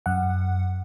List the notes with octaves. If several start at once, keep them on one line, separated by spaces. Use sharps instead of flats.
F#2 F#5